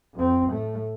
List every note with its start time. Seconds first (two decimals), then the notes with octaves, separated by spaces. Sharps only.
0.14 F2 C4
0.50 A2 A3